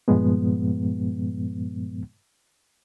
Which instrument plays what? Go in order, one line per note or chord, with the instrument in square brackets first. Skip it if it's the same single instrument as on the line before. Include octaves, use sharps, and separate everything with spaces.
[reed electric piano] G2 A#2 F3 G#3 B3